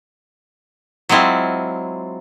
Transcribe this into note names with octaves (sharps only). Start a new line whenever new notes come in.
F#3 G#3 C4 E4 F4